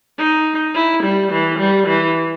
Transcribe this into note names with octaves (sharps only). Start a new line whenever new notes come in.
D#4
E4
G3
E3
G3
E3